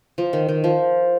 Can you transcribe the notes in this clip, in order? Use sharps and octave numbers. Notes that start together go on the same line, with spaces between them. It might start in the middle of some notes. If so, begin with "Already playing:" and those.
F3
D#3
D#3
F3